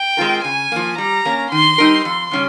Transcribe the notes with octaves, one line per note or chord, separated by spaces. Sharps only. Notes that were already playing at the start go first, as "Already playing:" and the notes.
Already playing: G5
G#3 C4 F4 A#4
C#3 G#5
F3 A#3
G3 A#5
A#3 C#4
D#3 C6
G3 C4 D#4 A#4
F2 C6
C#3 G3 C#4